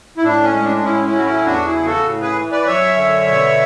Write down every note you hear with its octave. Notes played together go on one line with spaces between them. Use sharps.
E4
A2 D4
C#4
G#3
D4
D4
A2 C#4 E4
C#4 E4
F#3 F#4
C#4 E4
E2 D4 F#4
E4 G#4
C#3
F#4 A4
A2
G#4 B4
E3
B4 D5
F#2 C#5 E5
D3
B2